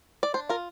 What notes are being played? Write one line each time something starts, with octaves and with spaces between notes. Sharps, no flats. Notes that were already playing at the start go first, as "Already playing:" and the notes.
D5
D4 C5
F4 A#4